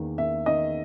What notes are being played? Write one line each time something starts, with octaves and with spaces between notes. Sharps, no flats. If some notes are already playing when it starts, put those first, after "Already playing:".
Already playing: E2 D#3 A#3
A#3 E5
D#3 D#5